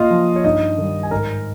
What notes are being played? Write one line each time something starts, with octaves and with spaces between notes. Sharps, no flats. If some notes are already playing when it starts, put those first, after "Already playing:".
Already playing: A#2 F4 D#5 F5
F3
C#5
G2 D#4 D#5
D#3 G3
G#5
G#2 A#4 A#5